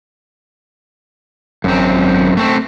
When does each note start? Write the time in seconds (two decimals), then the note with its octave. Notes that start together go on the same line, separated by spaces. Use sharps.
1.64 G#1 F#2 C4
2.37 A3 C4